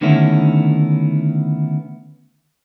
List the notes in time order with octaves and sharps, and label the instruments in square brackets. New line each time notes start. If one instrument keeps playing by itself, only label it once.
[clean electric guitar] D3 D#3 A3 B3 C#4 E4